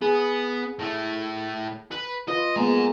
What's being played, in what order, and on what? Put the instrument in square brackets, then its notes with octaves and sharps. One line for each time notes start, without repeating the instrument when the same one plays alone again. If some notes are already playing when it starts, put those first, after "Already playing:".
[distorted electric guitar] B3 [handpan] G#4
[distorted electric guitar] A2 A3
B4
[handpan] F4 B4 [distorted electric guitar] D#5
[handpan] G#3 A#3 B3 [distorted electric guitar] G#5 A#5